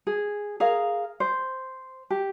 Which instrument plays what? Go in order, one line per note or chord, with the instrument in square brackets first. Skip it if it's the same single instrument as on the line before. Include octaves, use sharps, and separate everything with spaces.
[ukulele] G#4
G#4 A#4 F5
C5
G4